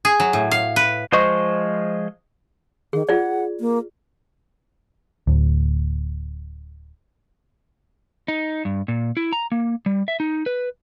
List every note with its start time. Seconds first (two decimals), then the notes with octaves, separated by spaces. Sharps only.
0.05 G#4
0.20 F#3
0.33 A2
0.51 F5
0.76 B4
1.12 F3 G#3 C5 D#5 C#6
2.93 D#3 G#4
3.09 F4 G#4 D5 F#5
3.60 A#3
5.27 D1 D2
8.28 D#4
8.65 G2
8.88 A#2
9.17 E4
9.33 A#5
9.52 A#3
9.86 G3
10.08 E5
10.20 D#4
10.46 B4